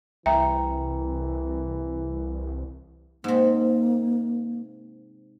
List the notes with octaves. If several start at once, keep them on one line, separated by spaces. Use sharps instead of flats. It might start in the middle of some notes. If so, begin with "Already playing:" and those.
C2 E3 E5 G5 A#5
G#2 C3 A#3